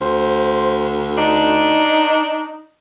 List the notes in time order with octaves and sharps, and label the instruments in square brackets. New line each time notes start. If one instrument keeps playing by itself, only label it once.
[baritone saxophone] D2 [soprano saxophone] C5
[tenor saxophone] D4 [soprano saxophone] D#4